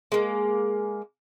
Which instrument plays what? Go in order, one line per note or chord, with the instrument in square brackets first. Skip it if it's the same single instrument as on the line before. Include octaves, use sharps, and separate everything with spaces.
[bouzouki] G#3 A#3